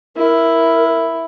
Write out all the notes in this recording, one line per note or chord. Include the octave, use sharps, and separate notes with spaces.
E4 A#4